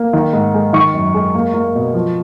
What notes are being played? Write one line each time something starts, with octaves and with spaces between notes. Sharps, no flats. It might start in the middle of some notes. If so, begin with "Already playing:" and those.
Already playing: A#3
D#3
G#2
G#3
D#3 C#6
F#2
G#3
A#3
A#3
B2
F3